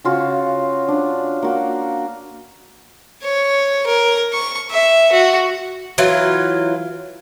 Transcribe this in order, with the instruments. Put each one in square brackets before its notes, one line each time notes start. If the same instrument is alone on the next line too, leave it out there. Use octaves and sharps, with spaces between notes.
[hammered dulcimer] C#3 F4 F#4
D4
A#3 F#4
[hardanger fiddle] C#5
A#4
C#6
E5
F#4
[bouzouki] E3 F#3 F4